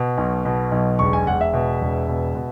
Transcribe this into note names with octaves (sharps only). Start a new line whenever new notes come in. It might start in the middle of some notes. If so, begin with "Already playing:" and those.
Already playing: B2
B1
B2
B1
E1 C#6
G#5
E1 F#5
E5
B2
E1
B2
B2